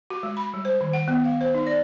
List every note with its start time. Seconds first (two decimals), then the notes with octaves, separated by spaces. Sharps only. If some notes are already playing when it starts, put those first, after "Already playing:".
0.10 F#4
0.23 G#3
0.37 B5
0.54 G3
0.65 C5
0.81 D#3
0.93 F#5
1.08 B3
1.24 F5
1.41 C5
1.54 D#4
1.67 D5